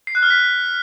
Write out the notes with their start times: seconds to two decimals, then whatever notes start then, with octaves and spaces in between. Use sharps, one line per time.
0.07 C7
0.15 F#6
0.23 F6
0.30 B6